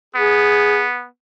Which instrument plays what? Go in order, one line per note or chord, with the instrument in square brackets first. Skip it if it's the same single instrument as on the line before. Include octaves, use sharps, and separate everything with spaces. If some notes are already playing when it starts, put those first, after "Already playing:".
[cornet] B3 [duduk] G#4